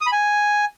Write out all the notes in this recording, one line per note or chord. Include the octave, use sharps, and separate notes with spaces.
D#6
B5
G#5